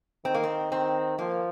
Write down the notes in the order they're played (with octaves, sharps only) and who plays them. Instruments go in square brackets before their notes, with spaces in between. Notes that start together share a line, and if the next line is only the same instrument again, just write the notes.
[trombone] D#3 [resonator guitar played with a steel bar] C4
[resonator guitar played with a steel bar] A#3
C4
[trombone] D#3 [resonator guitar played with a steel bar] C4
[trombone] F3 [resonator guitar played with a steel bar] A#3